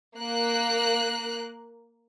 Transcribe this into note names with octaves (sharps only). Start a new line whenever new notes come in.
A#3 F#6